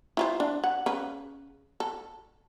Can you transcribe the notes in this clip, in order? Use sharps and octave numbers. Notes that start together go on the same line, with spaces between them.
E4 F4 C5
D4
F#5
C#3 B4
A4